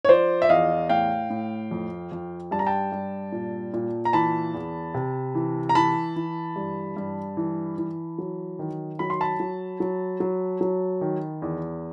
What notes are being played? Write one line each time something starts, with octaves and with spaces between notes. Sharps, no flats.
C#5
F3 C5 D5
E5
E2 D#5 F5
A2 F5 G5
A2
F2
F2
G2 A5
A#5
G5 A5
G2
A#2
A#2
A#5
E3 A5 B5
E2
C3
E3
A#5
E3 A5 B5
E3
G2
G2
E3
E3
F#3
D#3
F#3 B5
C6
A5 B5
F#3
F#3
F#3
F#3
D#3
E2